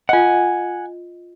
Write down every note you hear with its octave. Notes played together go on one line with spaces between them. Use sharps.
F4 D#5 F#5 G#5